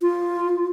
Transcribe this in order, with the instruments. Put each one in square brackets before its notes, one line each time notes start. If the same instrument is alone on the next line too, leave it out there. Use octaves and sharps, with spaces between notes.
[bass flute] F4